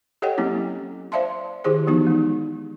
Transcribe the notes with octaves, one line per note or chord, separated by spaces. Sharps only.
G4 A4 C#5 D#5 F#5 G5
F#3 A#3 C4 C#4 E4
C5 D5 E5 F5 A5 C6
D#3 E4 G4 G#4 C5
E3 F3 B3 D#4 F#4
G#3 D#4